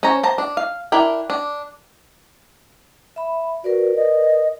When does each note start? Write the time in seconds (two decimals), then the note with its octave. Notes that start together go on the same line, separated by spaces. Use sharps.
0.03 C#4 C5 C#5 A#5
0.23 C5 A5 A#5
0.38 D4
0.57 F5
0.92 D4 E4 A#4 G5
1.30 D4
3.16 E5 B5
3.64 F#4 A#4 B4 D5
3.96 D#5